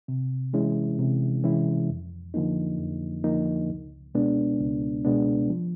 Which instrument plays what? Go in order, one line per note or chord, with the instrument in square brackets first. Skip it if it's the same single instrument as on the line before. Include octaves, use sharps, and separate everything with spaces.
[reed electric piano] C3
E3 G#3 C#4 E4
C3
E3 G#3 C#4 E4
F2
D3 F3 A#3 D#4
F2
D3 F3 A#3 D#4
C#2
B2 G#3 B3 D4
C#2
B2 G#3 B3 D4
F3